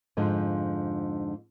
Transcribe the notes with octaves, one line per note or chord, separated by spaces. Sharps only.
F2 G#2 D3 F3 G#3